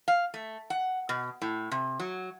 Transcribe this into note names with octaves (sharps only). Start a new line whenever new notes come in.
F5
A3
F#5
B2
A2
C3
F#3